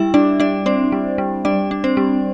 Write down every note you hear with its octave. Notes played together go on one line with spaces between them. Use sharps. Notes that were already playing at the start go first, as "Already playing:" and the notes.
Already playing: G3 E4 E5
G3 D4 D5
G3 D4 D5
C4 D4 C5
G3
G3
G3 D4 D5
D4
C4 C5
G3